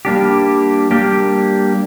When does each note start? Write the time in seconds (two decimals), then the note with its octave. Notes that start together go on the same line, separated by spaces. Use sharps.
0.05 G3 A#3 D4 G4
0.91 G3 A#3 D4 G4